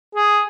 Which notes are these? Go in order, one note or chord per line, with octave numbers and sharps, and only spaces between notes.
G#4